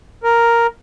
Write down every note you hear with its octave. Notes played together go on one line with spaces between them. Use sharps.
A#4